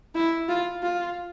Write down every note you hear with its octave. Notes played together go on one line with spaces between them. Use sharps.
E4
F4
F4